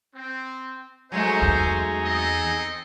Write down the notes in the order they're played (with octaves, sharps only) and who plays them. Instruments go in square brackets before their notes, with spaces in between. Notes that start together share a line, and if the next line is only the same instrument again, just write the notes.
[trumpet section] C4
[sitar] F#3 G#3 A3 [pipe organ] D#4 G#4 [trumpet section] C5
[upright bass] E2
[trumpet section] C4 A4 D#5